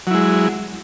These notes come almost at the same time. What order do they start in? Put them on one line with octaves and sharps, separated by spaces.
F#3 E4 G#3